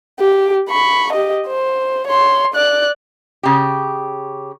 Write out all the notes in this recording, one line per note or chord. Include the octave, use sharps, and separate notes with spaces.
G4
B5 C#6
G4 D#5
C5
C#5 C6
D5 F#6
C#3 G4